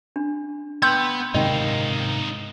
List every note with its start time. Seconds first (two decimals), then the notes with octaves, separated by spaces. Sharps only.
0.16 D4
0.82 B3 B4 G5 C6 E6 G6
1.34 G#2 C3 D#3 D#4 F4 D#5 G5